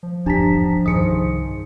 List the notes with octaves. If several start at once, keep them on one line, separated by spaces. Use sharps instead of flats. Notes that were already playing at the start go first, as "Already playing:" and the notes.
F3
D1 G1 E2 D4 G4 A5 A#5 B6
C2 G2 D#3 D#4 G#4 C5 D#6 C#7